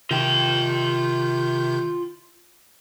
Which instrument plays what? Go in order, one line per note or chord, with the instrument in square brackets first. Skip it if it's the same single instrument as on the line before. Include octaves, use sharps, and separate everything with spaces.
[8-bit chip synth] C3 D#3 G6 [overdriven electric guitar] F4 G5